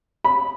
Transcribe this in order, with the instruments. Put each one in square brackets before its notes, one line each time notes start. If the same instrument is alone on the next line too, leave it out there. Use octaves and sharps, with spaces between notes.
[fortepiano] B5